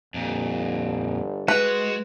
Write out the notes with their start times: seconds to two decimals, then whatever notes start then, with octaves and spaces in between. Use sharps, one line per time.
0.14 G1 F2 A#2
1.48 G#3 F#4 B4